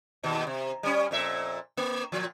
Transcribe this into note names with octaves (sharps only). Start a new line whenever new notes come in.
D#2 B2
C3
G3 C#4
F2 A#2 E5
A#3
A#2 F3